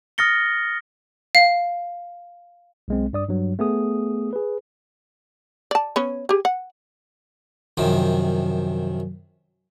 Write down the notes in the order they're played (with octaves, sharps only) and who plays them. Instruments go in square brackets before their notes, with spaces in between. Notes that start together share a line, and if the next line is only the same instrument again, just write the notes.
[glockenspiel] D#6 F6 A6 A#6 C#7 G7
[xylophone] F5
[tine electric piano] B1 G#3 C4
G2 D5 D#6
G2 F#3
A3 B3 G#4 D#6
G#4 B4
[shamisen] D5 A5
B3 C#4 C#5
G4 G#4
F#5
[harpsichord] F#2 C3 D#3 F3